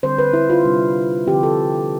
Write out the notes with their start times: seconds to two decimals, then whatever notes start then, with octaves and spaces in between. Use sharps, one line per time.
0.03 D3 G3 C4 C5
0.18 B4
0.33 E4
0.50 F4
0.65 C3 G3 D4
1.26 D3 F3 C4 G4
1.43 A4